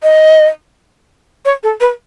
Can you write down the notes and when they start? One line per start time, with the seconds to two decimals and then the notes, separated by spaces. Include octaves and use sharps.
0.03 D#5
1.45 C#5
1.63 A4
1.80 B4